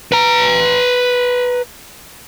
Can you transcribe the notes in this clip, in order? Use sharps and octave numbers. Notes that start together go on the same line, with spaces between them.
B4 A#5